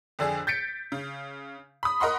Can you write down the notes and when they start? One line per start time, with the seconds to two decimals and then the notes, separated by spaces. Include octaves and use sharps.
0.19 F2 D3 D4 G#4
0.47 G6 A6 B6 C#7 D7
0.92 C#3
1.83 B5 D#6
2.00 A#4 D#5 F#5 B5 C6